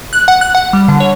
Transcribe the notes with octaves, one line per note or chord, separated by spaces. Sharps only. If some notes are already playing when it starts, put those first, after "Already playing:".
F#6
F#5
F#6
F#5
G3
D3
C#5